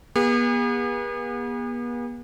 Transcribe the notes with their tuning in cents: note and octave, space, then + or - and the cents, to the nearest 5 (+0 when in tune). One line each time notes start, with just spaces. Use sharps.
B3 -45 G#4 -45